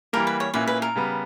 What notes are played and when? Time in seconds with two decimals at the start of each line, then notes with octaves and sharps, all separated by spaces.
0.13 E3 G3 A#3 A#4
0.27 B4
0.40 C#5
0.54 A#2 A#3 C#4 E4 B4
0.67 B4
0.82 A#4
0.95 C#3 G3 B3